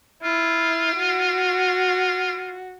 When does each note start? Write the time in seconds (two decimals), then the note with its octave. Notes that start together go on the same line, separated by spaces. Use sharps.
0.23 E4 F4
0.97 F#4